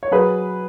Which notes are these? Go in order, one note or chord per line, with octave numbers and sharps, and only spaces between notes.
C#5
F#3 G#4 B4